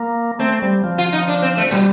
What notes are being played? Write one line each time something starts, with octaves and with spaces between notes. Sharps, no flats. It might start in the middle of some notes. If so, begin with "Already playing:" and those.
Already playing: A#3
A3 C4
G3
F3
F4
D#4
D4
C4
A3
A#2 G3